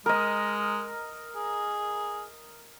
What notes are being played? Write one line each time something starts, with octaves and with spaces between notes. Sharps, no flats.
G#3 A#4 D#5
G#4